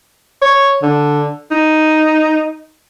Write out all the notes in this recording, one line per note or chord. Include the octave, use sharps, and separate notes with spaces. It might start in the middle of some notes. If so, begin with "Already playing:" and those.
C#5
D3
D#4